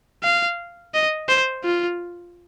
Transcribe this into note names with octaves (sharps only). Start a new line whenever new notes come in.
F5
D#5
C5
F4